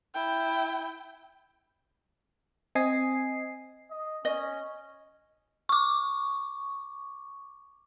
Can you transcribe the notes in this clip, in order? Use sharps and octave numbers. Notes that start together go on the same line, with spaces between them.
E4 G5
C4 D#5 G#5 C7
D#5
C#4 D#5
C#6 D6